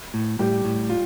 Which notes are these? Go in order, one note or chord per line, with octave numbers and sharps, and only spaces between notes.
A2
A2 G3 G4
A2
F4